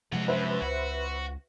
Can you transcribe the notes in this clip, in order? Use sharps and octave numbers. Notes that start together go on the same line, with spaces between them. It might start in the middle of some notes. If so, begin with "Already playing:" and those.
C3 F3 G#3 A3 F#5
F#2 B4 C5 E5
C#2 F#4